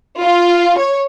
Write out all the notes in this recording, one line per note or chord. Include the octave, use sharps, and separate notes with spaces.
F4
C#5